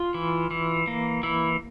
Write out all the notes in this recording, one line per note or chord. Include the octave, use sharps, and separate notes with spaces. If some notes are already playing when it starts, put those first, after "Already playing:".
Already playing: F4
E3
E3
A#3
E3 E4